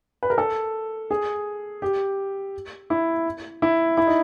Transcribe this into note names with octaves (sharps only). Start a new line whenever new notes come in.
B4
A#4
A4
G#4
G4
E4
E4
E4
D#4